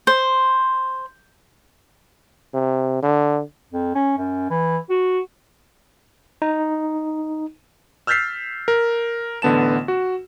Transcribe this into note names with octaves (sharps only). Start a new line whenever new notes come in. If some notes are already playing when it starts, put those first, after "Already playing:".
C5
C3
D3
F2
C#4
F#2
E3
F#4
D#4
E6 F6 G6 A6 B6 C7
A#4
A1 D3 B3 A5 E7
F#4